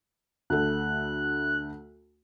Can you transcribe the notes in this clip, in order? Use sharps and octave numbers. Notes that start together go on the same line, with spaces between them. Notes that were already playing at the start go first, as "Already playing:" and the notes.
D2 A3 F#6